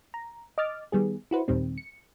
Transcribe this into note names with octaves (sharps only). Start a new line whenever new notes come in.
A#5
D#5 D6 F6 A6
D#3 G3 B3 G#4
E4 F#4 B4 C5
D#2 A#2 D#3 G3 C4
C#7